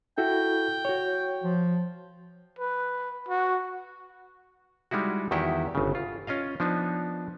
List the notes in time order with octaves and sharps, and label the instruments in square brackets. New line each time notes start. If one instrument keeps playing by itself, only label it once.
[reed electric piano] E4 F#4 A4 [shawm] G5
[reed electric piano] F#4 C#5
[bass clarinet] F3
[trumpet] B4
F#4
[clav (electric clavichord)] G3 G#3 D#4 E4 F#4
E2 D#3 E4 F#4 G4 G5
G1 C#3
F4
C#4 F4 D#5 F5
F3 B3 D4 D#4